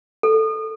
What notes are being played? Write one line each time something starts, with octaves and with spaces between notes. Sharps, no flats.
A4